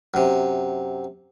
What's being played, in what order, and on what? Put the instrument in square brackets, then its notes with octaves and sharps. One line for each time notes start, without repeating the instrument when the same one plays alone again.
[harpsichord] F#2 C3